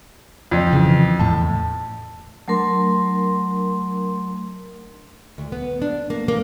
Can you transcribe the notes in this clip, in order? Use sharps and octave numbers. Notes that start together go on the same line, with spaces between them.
F2
C#3 E3
E2 A2 A5
F#3 A3 D4 A#4 C6
D2
B3
D4
A#3
A#3